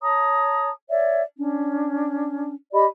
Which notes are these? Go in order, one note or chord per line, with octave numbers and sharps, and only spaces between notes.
C#5 A5 A#5 D#6
C#5 D5 E5
C#4 D4
G4 D5 D#5 B5